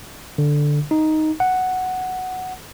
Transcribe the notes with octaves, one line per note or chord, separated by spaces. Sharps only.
D3
D#4
F#5